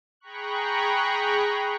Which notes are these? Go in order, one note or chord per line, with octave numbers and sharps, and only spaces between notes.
G#4 G5 A#5 B5 C#6 F#6